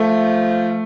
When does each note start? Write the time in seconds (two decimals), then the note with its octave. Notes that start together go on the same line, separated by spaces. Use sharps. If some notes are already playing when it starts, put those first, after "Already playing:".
Already playing: F3 A3